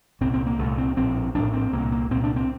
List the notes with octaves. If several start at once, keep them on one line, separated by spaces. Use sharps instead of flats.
C2 A#2 C4
C4
A#3
C2 A#2 A3
C4
A#1 A2 C4
A#1 A2 D4
C4
C2 A#2 A#3
A#3
C2 A#2 C4
D4
C4